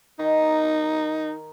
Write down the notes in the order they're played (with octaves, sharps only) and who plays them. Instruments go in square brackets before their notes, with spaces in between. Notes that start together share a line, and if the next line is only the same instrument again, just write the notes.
[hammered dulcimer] D#3 [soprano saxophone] D#4